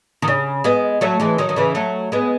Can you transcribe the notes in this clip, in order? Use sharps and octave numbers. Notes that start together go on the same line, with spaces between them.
D#3
C#3
G#3 B3
F#3 A3
E3 G#3
D#3 F#3
D#3
C#3 E3
F#3 A3
G#3 B3